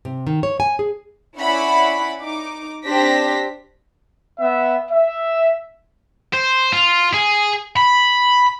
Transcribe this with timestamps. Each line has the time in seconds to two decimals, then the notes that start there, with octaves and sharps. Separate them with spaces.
0.05 C3
0.27 D#3
0.43 C#5
0.60 G#5
0.79 G#4
1.38 C#4 E4 D5 F#5 B5
2.21 D#4 D6
2.85 C4 D4 G4 C5 A#6 B6
4.40 B3 E5
4.91 E5
6.33 C5
6.73 F4
7.14 G#4
7.76 B5